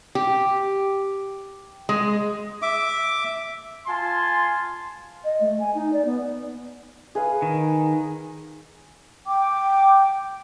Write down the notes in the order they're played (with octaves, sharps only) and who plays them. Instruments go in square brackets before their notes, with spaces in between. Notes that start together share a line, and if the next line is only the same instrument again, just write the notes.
[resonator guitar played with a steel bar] G4
G#3
[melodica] E5 D6
[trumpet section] F4 G#5 A5 C6
[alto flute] D#5
A3
G#5
D#4
D5
B3
[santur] G#4 B4 F5
[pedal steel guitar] D#3
[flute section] G5 D6